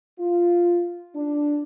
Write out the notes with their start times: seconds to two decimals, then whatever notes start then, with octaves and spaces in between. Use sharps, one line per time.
0.19 F4
1.16 D4